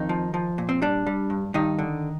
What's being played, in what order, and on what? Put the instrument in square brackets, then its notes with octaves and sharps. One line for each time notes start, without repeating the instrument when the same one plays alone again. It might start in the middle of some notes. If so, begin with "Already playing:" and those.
Already playing: [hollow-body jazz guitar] F2 D#3 D#4
F3
F3
A#2
C4
G3 D4
G3
G2
G2 D#3 D#4
D3